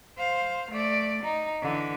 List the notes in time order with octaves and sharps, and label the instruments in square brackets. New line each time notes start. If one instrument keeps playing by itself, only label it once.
[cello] C5 F5
A3 D5
D#4
D3 E3